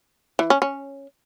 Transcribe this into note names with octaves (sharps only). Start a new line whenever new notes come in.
E3
C#4
C#4